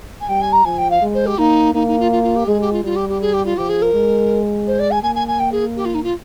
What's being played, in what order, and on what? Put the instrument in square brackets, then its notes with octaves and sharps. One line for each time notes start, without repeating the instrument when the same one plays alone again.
[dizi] G#5
[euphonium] G3 [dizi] G5
[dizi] G#5
A#5
[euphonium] F3 [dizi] G#5
[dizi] G5
F5
[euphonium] G#3
[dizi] C5
G4
[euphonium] A#3 [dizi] D#4
[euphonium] A#3 [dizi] D#4
[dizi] D#4
F4
F4
F4
G4
[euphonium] G#3 [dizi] G#4
[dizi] G4
F4
[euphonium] G3 [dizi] F4
[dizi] G4
G4
G#4
G4
F4
[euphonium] F3 [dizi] G4
[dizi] G#4
A#4
[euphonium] G#3
[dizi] C5
D5
G#5
[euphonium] A#3 [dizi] G#5
[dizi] G#5
G#5
G5
G#4
G4
F4
D#4
F4